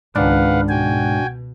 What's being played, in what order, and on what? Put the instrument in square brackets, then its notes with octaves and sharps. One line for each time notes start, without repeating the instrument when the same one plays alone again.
[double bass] C#2 D#3 [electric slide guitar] G#2 [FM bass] D4 [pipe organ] B4 F5 F#5
[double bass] B2 [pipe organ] F#4 G5 G#5